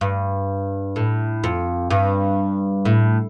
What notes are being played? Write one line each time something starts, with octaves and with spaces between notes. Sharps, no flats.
G2
A2
F2
G2
A2